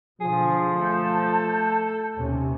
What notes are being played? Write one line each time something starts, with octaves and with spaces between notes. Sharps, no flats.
B2 D3 F3 G#4
A3 A4 A5 G6
D#2 C3 C#4